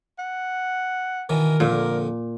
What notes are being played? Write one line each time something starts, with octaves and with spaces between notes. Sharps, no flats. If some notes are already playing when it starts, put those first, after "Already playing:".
F#5
B2 D#3 E3 A#4
F2 A#2 D3